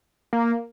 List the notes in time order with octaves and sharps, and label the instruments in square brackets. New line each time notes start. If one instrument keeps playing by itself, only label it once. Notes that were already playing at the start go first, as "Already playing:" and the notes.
[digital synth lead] A#3